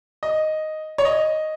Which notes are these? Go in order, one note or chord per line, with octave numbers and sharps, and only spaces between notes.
D#5
C#5
D#5